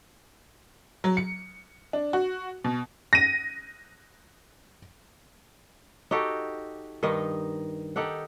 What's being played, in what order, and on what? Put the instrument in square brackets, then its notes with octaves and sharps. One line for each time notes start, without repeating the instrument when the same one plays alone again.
[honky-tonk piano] F#3
C#7
D4
F#4
B2
A#6 D#7
[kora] D#4 F#4 G4 A4
G2 D#3 D#4 D#5
D#4 G4 A4 F#5